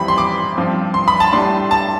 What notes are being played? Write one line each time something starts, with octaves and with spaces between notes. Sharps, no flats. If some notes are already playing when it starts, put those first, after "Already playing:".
Already playing: F2 E3 G3 C4 B5
C6
D6
G2 F3 C4
C6
B5
A5
A2 G3 D4 C6
A5